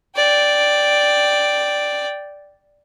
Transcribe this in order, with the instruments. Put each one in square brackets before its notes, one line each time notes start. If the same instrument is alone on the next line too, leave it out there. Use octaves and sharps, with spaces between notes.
[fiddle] D5 G5